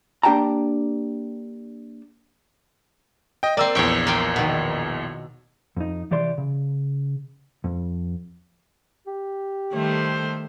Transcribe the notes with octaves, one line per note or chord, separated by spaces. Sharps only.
A#3 D4 G4 G5 A5 A#5
D#5 G5
A#3 C4 D5 E6
A#1 E2 C#5 G5
A#3 F4 G5
B2 D#3
F2 D#4
C2 E3 G4 D5 C6
C#3
F2
G4
D#3 G3 A3 A4 C5